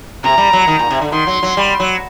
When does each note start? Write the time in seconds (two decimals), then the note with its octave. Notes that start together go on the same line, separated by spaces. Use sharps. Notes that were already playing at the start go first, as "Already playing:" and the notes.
0.24 C3 A#5
0.38 G3
0.53 F#3
0.67 D#3
0.79 A#2
0.91 C3
1.01 D3
1.12 D#3 C6
1.27 F#3
1.43 F#3
1.57 G3
1.80 F#3